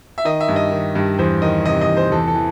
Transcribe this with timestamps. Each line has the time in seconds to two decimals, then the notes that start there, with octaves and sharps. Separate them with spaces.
0.18 E5
0.25 D#3 D#5
0.41 E5
0.48 G2
0.56 D#5
0.71 D#3
0.95 G2
1.18 E2 C5
1.42 D#3 D#5
1.65 C3 D#5
1.81 D#5
1.88 E2
1.97 C5
2.11 E2 A4
2.27 A4
2.35 E3